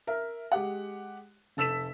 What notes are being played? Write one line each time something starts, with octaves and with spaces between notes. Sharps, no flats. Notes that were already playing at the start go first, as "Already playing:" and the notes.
A#4 E5
G#3 G4 F#5
F1 A4 E6 B6 E7